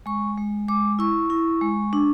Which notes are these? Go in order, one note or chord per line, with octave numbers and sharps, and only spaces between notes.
G#3 C#6
G#3
G#3 D6
E4 C#6
E4
G#3
D4